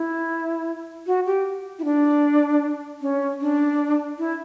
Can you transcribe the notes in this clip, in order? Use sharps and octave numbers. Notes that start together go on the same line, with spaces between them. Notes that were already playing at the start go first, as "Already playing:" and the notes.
Already playing: E4
F#4
G4
E4
D4
C#4
D4
E4